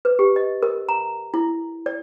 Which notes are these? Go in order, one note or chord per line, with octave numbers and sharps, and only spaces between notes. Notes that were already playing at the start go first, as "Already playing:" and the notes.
B4
G4
D#5
A#4
A#5
E4
D5